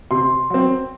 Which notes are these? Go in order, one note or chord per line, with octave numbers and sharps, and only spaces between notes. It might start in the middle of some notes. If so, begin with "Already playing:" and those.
C3 C6
F#3 C4